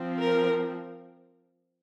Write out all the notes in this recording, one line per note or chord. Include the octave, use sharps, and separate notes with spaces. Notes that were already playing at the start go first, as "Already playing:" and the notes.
Already playing: F3 C4
A#4